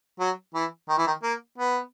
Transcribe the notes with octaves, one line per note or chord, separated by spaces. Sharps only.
F#3
E3
D#3
E3
D#3
A#3
B3